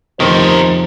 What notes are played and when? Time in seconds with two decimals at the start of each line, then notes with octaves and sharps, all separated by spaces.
0.20 F2 C3 D#3 F3 G4 A#4 C5